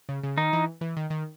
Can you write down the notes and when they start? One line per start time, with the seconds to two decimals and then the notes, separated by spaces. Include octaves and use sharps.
0.09 C#3
0.23 C#3
0.37 D#3 D#4
0.53 E3
0.81 E3
0.97 D#3
1.10 D#3